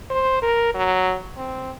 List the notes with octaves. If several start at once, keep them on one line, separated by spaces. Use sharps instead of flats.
C5
A#4
F#3
C4